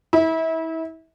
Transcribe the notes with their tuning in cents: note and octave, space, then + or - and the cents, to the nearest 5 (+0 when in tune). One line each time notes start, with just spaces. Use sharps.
E4 -35